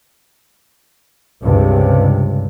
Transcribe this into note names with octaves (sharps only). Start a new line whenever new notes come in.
C#2 G2 C3